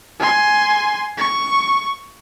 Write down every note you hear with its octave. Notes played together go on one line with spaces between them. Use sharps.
G#5 C6
C#6